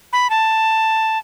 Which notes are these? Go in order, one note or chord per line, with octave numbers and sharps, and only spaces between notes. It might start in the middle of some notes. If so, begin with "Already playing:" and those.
B5
A5